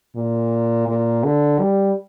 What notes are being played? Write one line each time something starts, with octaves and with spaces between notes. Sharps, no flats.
A#2
A#2
D3
G3